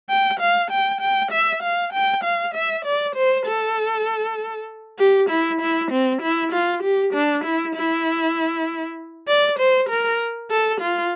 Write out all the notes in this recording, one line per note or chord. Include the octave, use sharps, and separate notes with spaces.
G5
F5
G5
G5
E5
F5
G5
F5
E5
D5
C5
A4
G4
E4
E4
C4
E4
F4
G4
D4
E4
E4
D5
C5
A#4
A4
F4